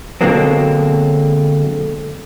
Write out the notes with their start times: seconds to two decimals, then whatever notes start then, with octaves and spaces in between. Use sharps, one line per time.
0.21 B2 D3 F#3 G#3 A#3 C4